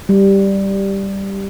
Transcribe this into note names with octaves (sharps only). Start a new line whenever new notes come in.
G3